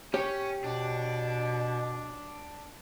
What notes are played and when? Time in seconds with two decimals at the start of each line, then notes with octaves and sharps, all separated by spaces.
0.14 C#4 G4 C#5
0.64 B2 D4